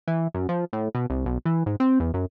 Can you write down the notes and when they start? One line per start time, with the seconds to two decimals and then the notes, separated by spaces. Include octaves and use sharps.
0.08 E3
0.34 F#2
0.49 F3
0.73 A2
0.95 B2
1.10 C2
1.26 B1
1.45 E3
1.66 G#2
1.80 C4
2.00 E2
2.14 F#2